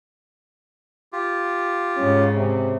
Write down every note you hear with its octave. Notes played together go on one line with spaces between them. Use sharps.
F4 G4
G#2 C#3 C#4
C3